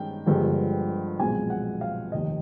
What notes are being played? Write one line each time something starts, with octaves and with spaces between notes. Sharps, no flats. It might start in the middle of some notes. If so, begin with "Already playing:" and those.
Already playing: G2 D#3 G#3 C#4 G5
G1 G2 D3 F3 G#3
B1 A#2 F3 G#3 C4 G#5
F#5
F5
F1 D#2 D#3 D#5